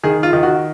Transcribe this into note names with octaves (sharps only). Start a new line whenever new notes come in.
D#3 G#4
F4
D#3
F#4